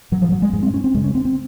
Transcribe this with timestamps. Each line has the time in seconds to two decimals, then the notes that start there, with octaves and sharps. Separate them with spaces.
0.12 G#2 F#3
0.22 F3
0.32 F#3
0.42 G#3
0.53 G#2 G#3
0.63 C4
0.74 C#4
0.84 C4
0.94 F#2 C#3 G#3
1.04 C#4
1.15 C4
1.25 C4